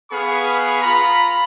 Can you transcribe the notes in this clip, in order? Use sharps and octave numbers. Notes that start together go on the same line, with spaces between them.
B3 G#4 F5 B5 C#6
F4 A#5 B5